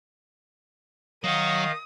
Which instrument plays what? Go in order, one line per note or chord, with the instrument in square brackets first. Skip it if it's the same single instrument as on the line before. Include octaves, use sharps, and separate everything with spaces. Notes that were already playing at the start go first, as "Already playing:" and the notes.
[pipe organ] D#3 D#5 F5 [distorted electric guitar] F#3 F#5 [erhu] D#6